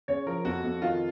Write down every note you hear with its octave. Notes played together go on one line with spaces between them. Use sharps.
C#3 C#5
F3 A#4
F2 F#4
F2
D#3 F4